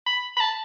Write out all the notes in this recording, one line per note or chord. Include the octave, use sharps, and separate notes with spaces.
B5
B5
A5